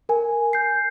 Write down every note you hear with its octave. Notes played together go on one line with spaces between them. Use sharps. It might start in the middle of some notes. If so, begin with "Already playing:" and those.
A#4 G#5
G6 C7